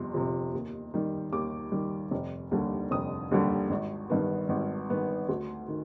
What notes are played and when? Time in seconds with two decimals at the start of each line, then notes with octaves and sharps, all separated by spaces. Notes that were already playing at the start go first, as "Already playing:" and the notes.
Already playing: G1 F2 C3 C6
0.14 F2 C3
0.53 D#2
0.94 D#3 G3
1.32 D#2 D6
1.72 D#3 G3
2.11 F1
2.51 D#2 D3 G3
2.91 F1 D#6
3.31 D#2 D3 G3
3.70 G#1
4.10 G2 D#3 B3
4.49 G#1
4.90 G2 D#3 B3
5.29 D2
5.68 D#3